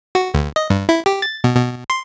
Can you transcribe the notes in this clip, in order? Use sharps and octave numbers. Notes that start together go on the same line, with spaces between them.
F#4
D2
D#5
G2
E4
G4
A6
B2
B2
C6